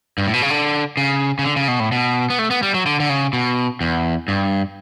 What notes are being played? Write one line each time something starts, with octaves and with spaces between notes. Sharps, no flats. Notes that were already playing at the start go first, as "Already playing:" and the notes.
G2
A2
B2
C#3
D3
C#3
C#3
D3
C#3
B2
A2
B2
B3
A3
B3
G3
F#3
D3
D3
C#3
B2
E2
G2